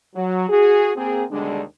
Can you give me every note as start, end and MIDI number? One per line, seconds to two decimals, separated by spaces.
0.16 0.46 54
0.49 0.92 66
0.49 0.92 68
0.97 1.25 58
0.97 1.25 60
0.97 1.25 68
1.31 1.62 39
1.31 1.62 47
1.31 1.62 50
1.31 1.62 55
1.31 1.62 56
1.31 1.62 62